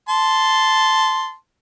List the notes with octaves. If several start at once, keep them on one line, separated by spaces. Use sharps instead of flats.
A5 C6